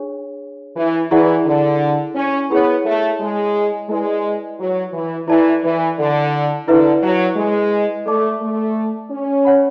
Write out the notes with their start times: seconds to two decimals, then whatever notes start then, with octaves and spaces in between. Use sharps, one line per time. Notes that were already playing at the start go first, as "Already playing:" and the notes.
Already playing: D4 G#4 C#5 G#5
0.76 E3
1.11 E3 E4 G#4 D5 F#5
1.46 D3
2.15 C#4
2.50 B3 E4 G#4 C#5
2.85 A3
3.20 G#3
3.89 G#3 E4 B4 D5
4.59 F#3
4.93 E3
5.28 E3 E4 A4 D5 A5
5.64 E3
5.98 D3
6.68 D3 E4 B4 E5
7.02 F#3
7.36 G#3
8.06 A3 A4 D5 A5 D6
8.41 A3
9.11 C#4
9.45 C#5 F#5 B5